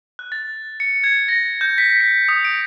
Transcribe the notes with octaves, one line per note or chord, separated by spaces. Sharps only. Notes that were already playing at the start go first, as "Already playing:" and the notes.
F#6
A6
C#7
G#6
A#6
G6
B6
C#7
D#6
D7